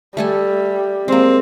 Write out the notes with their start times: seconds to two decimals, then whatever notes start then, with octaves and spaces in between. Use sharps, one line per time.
0.17 G3 A3 A4 G#5
1.08 G#3 A#3 C4